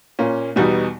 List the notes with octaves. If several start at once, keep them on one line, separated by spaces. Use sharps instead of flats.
A#2 A#3 C#4
E2 B2 G3 B3 D#4